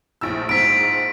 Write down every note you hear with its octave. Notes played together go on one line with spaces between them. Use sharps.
A#1 A2 E6
A#1 G#2 B6 D7